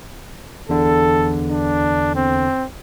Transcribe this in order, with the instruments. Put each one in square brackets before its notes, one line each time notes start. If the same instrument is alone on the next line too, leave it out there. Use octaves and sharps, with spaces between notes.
[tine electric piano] E2 D3 [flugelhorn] A4
[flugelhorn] D4
C4